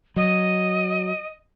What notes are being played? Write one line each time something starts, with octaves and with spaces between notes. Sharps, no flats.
F#3 D#5